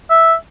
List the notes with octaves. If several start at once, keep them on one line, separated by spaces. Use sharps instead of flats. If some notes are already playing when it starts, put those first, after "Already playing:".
E5